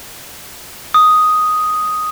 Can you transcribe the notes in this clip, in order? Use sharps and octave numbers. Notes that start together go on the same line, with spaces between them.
D#6